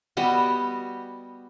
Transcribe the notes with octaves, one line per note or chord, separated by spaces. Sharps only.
G3 B3 F#4 D#5